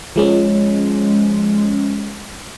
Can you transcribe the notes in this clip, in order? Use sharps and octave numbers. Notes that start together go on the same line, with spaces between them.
F3 G#3 C#4